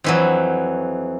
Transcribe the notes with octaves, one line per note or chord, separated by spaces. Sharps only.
F2 E3 F#3